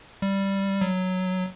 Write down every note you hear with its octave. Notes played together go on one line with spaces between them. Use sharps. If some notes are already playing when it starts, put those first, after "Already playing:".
G3
F#3